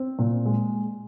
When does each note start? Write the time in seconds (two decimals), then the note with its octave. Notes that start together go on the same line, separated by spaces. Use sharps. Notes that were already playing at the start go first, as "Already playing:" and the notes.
Already playing: C4
0.19 A#2
0.45 G#3